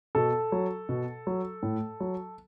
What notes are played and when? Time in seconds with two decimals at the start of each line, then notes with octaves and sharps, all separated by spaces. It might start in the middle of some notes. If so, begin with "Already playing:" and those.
0.15 B2 A4
0.52 F#3
0.89 B2
1.27 F#3
1.63 A2
2.01 F#3